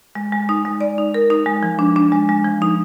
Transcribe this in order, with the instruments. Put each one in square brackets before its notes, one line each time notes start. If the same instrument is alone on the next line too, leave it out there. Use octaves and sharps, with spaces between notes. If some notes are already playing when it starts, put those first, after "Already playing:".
[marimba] G#3
G#3
D#4
G#3
D5
D#4
A#4
D#4
G#3
F3
D4
D4
G#3
G#3
F3
D#4